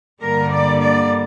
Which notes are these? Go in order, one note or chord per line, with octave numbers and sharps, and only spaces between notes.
G2 D3 G3 A#3 A#4
D5
D5